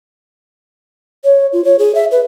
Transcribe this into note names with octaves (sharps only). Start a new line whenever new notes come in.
C#5
F4
C#5
G#4
E5
B4